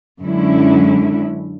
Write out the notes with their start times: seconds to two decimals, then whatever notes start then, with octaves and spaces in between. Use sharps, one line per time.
0.21 F#2 D3 G#3 C#4 E4